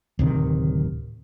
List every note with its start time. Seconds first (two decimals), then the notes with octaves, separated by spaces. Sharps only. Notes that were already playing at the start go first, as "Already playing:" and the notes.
0.19 D1 C3 D#3